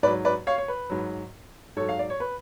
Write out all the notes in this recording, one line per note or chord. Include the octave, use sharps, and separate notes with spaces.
G#2 F#3 B4 D5
B4 D5
C#5 F5
C#5
B4
G#2 F#3
G#2 F#3 A4 C#5
F5
D5
C#5
B4